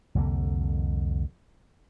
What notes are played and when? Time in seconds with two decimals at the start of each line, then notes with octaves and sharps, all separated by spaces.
0.15 C2 F2 D3 A#3